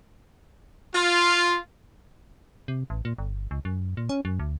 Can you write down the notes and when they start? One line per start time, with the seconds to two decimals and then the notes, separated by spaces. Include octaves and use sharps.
0.95 F4
2.68 C3
2.90 A1
3.05 A#2
3.18 G1
3.51 C#2
3.65 F#2
3.97 A#2
4.09 C#4
4.25 F#2
4.39 D2